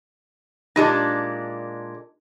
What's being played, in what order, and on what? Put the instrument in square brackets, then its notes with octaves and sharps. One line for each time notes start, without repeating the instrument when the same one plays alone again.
[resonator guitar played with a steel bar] A#2 G#3 D4 [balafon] D#4 G4